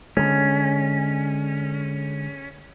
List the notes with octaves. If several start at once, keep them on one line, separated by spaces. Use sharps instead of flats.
D3 G#3 C#4